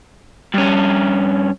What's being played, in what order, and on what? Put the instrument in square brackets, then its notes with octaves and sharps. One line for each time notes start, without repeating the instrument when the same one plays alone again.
[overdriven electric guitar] G2 C#4